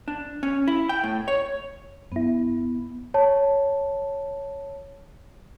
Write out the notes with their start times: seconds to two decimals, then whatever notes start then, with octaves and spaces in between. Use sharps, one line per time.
0.08 D4
0.43 C#4
0.68 E4
0.89 G5
1.04 A2
1.28 C#5
2.12 F#2 B3 E4
3.14 C#5 A5